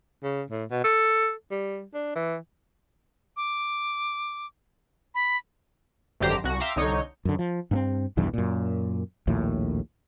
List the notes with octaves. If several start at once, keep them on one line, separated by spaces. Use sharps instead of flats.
C#3
A2
B2
A4
G3
D4
E3
D6
B5
G#1 F#2 D3 G4 C5 A#5
C2 F#4 A#6
E5 F5 G5 A#5 C6 D6
C2 D3 D#4 C#5 G6 C#7
F#2 D3
F3
G2 A#3 C4
B1 E2 G2 E3
F#2 A#2
A#1 D#2 A2